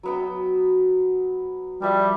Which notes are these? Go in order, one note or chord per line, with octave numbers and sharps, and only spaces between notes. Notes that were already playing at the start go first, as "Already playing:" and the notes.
F#3 B3 G5
F3 G3 E5 A5